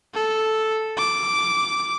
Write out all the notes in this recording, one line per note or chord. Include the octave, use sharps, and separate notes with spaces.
A4
D6